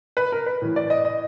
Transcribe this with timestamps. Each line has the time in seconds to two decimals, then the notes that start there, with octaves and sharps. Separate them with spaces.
0.17 B4
0.32 A#4
0.46 B4
0.62 A2 E3
0.76 D5
0.90 D#5
1.05 D#5